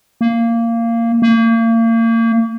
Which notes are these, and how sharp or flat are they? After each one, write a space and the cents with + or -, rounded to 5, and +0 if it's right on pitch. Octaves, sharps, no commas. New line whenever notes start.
A#3 -15
A#3 -35